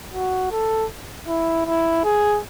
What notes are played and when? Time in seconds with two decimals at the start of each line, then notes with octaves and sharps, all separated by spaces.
0.13 F#4
0.52 A4
1.28 E4
1.67 E4
2.05 G#4